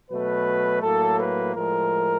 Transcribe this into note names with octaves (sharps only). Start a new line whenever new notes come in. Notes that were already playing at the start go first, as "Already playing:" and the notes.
B2 F#3 A3 B4
A2 F#3 A#3 A4
B4
A2 F3 G#3 A#4